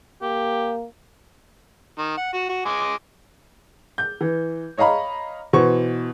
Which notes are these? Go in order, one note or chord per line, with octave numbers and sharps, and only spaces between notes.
A#3 G4
D#3
F#5
F#4
F#4
G#3 G#5 D6
G6
E3
C#5 D#5 F5 A#5 B5
B2 E3 C5 C#6